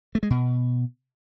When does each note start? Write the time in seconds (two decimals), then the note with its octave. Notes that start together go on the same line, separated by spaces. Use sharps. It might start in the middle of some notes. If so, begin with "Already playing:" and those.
0.15 A3
0.23 G#3
0.30 B2